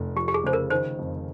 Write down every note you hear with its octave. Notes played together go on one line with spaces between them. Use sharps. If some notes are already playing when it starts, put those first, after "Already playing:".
Already playing: F1
F3 G4
G4
G#4
C#3 C5
A#4
D#3 C5
F2